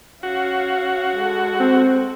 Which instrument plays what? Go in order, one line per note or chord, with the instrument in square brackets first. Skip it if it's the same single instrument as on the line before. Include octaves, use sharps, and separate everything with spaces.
[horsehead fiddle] C#4 F5 [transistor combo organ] F#4
[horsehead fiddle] G#3 A4
[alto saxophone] C4